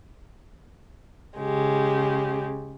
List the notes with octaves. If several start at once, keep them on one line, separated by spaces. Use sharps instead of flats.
C#3 G#3 G4